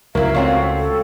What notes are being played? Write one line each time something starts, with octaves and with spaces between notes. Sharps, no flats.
C#2 F#3 E4 A#4 F5
A3 C4 F4 F#4 C#5 G5
A4